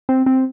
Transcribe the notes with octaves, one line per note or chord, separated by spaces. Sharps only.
C4
C4